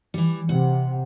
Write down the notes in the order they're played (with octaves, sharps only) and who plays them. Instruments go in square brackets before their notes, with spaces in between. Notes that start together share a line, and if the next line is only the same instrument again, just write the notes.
[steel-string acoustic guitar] E3 G3
[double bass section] C3 [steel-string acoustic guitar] F#5